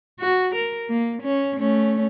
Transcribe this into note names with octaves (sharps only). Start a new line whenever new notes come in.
F#4
A#4
A#3
C#4
A3 C#4